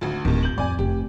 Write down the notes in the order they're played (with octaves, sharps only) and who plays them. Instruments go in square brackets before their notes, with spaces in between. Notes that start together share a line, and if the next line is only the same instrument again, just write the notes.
[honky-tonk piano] G#1 D2
[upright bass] D1 [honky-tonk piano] D#2 D#3
[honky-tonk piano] G6 F#7
[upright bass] F2 [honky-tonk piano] D5 G#5
[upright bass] F1 [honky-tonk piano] G4